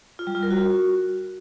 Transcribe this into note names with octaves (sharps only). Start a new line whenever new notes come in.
F4
G3
F4
A#4
F#4